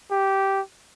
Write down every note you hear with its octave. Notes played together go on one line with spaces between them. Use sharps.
G4